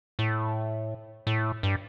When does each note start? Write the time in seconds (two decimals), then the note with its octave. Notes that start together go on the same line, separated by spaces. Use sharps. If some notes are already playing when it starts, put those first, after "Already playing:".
0.19 A2
1.27 A2
1.63 G2